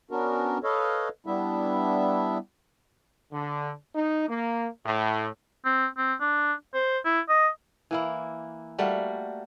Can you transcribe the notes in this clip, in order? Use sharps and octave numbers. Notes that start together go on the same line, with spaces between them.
B3 C#4 D4 F#4 A#4
A4 B4 C#5 D#5 F5
G3 B3 D4 E4 E5
D3
D#4
A#3
A2
C4
C4
D4
C5
E4
D#5
E3 A#3 E4
G3 A3 A#3 F#4